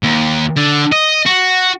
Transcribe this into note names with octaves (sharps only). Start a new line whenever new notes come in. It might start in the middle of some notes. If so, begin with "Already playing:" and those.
D#2
D3
D#5
F#4